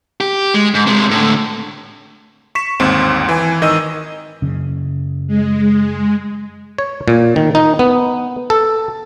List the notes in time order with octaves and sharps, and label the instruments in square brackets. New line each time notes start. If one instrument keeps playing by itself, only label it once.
[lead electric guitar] G4
G#3
G#2
C3 G#3
A2 D3
[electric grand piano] C#6 B6 E7
G1 D#2 G#2 C4 C6
E3 G#5
G#1 D#3 D#5 E6 D#7
[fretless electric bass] F#2 C#3
[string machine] G#3
[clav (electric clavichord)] C#5
A#2
D#3
D#4
B3
A4